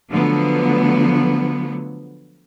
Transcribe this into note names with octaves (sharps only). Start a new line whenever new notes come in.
D3 F3 F#3 A3 B3